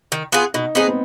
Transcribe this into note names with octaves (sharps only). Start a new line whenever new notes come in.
D#3
B3 F4 G#4
B2 D#4
B3 C4 D#4 G#4
B3